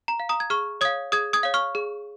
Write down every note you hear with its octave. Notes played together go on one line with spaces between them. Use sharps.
A#5
F5
A#5 D#6
G#6
G#4 C#6 F6
C#5 F5 D#6 G#6
G#4 D#6 G#6
D#6 G#6
C#5 F5
C#6 F6
G#4